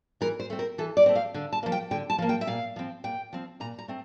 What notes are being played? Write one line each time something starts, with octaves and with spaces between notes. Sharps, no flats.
E3 A#4
C5
A3 C4
A#4
E3 A4
D5
A3 C4
F5
D3
A5
F3 A#3
G5
D3 G5
A5
F3 A#3
G5
E5
A#2 F5
F3 C4
A#2 G5
F3 C4
A#2 A#5
A#5
A3 C4